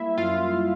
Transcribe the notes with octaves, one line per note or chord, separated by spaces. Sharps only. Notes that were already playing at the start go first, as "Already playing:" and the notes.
Already playing: G3 A#3 E4 E5
F#2 F4 F5